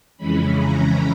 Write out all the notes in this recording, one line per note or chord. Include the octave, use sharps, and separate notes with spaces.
F2 C#3 E3 G#3 C#4 B5
A#5